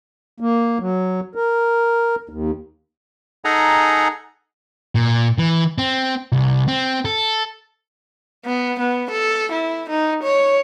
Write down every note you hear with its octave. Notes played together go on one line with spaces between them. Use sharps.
A#3
F#3
A#4
D#2
D#4 G#4 A4 F#5 G#5 A#5
A#2
E3
C4
C2
C4
A4
B3
B3
A4
E4
D#4
C#5